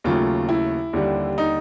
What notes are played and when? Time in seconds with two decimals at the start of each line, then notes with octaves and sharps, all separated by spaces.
0.04 D#2 C#3 F#3 A3 F4
0.49 E4
0.93 D#2 D3 G3
1.38 D#4